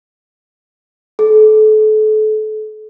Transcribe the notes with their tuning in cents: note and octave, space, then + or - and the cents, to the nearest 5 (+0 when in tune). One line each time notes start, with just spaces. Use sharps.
A4 -35